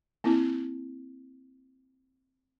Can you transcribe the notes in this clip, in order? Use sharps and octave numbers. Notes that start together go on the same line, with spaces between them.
A#3 C4 E4